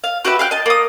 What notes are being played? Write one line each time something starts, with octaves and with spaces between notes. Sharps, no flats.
F5
F#4 G4 B4 E5
F5 G5 F#6
D#5 A5
A#3 D#6